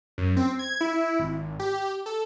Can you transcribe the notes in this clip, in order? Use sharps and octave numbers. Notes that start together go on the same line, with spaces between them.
F#2
C4
G#6
E4
G#1
G4
A4